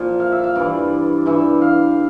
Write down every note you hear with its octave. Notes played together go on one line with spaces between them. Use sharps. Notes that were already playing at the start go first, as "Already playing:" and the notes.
Already playing: A#2 F3
F5
E5
F5
G2 E3 D5
G2 E3 E5
F5